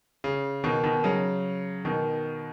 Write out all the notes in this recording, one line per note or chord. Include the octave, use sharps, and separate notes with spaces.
C#3
B2 D#3
B2 D#3
C#3 F#3
B2 D#3